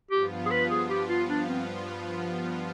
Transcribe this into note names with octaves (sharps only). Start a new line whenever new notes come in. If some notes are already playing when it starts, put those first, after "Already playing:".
G2 F3 B3 F4 G4
G#4
B4
G#4
G4
F4
D4
C4